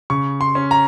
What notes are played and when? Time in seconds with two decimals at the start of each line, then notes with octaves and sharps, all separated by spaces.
0.10 C#3 C#6
0.41 C6
0.55 C#4
0.71 A#5